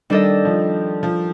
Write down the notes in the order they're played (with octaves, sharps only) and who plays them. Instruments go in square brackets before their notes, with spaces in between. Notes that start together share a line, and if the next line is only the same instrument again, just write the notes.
[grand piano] D#3 [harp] G3 D4 A4 D#5
[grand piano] F3
F3